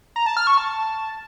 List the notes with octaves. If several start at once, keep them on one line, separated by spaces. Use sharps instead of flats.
A#5
A5
F6
C#6
A5